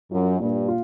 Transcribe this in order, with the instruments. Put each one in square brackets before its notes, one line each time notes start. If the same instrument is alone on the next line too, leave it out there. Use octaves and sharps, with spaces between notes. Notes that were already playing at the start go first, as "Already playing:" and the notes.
[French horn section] F#2 [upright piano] F4
[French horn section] G2 [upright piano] A#2
[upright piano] F4